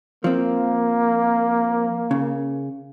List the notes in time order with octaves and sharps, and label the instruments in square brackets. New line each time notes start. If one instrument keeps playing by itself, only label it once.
[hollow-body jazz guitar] F3 C4 [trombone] A#3
[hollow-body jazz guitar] C#3